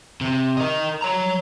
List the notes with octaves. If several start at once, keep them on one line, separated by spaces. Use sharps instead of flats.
C3
A#4 D#5
C#5 A#5